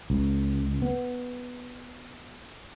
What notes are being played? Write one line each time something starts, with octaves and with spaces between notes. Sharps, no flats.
C#2
B3